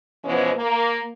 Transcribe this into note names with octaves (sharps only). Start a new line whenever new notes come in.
B2 E3 F3 G#3 B3 C#4
A#3